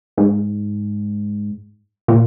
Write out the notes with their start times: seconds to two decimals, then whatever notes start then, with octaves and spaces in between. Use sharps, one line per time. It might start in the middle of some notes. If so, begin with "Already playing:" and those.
0.18 G#2
2.08 A#2